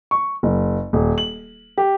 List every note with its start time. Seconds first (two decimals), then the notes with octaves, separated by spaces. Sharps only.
0.11 C#6
0.43 F#1
0.93 D#1
1.18 F#7
1.78 G4